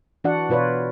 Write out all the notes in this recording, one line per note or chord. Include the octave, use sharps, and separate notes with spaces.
E3 D4 F#4 D5 F#5
B2 F4 B4 C#5 D5